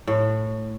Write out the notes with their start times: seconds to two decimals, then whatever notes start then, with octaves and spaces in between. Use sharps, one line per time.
0.07 A2